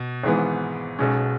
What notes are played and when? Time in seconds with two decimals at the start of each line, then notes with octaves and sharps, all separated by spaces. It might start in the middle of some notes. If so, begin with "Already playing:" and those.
Already playing: B2
0.23 G#1 G#2 E3 B3
0.99 B1 B2 G#3 C#4